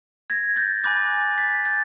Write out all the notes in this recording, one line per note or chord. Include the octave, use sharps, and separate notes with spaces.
G#6 A#6
G6 A6
G#5 B5 D6 F#6 G6 A6
A6 B6
G6 A6